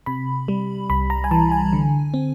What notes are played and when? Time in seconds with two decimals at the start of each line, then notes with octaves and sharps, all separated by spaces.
0.06 C3 B5
0.48 G3
0.90 C2 B5
1.10 A#5
1.24 G#5
1.31 E3 A5
1.52 G#5
1.73 D3
2.14 C4